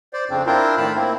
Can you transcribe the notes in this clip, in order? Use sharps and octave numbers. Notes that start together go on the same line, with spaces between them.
C5 D5
F2 C#3 C4 D4
C4 D4 E4 F4 A#4 C5
A2 D#3 A5 B5
A#3 C4 E4